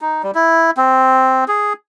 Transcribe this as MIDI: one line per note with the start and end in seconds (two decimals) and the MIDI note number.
0.01 0.22 63
0.23 0.31 55
0.35 0.71 64
0.77 1.44 60
1.48 1.73 68